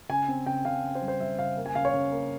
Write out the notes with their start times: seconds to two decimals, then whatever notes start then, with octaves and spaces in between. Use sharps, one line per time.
0.09 C#3 G#5
0.28 C4
0.46 C#3 G5
0.65 C#3 F5
0.84 C#3
0.95 C5
1.02 G3
1.08 C5
1.20 G3 E5
1.39 C#3 F5
1.57 A#3
1.66 G#5
1.75 C#3 F5
1.85 C#5
1.94 C#3
2.12 A#3